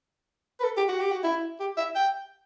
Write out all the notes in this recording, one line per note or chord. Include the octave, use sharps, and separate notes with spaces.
B4
A4
G4
F#4
G4
F#4
E4
G4
E5
G5